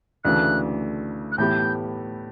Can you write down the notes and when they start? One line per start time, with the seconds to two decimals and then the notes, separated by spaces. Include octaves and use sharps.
0.24 D2 C#3 E3 A3 F#6
1.32 F#6
1.38 A2 E3 B3 E4 G4 G6